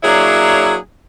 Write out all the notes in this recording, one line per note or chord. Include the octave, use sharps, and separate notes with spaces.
F#3 A#3 D4 E4 G#4 C#5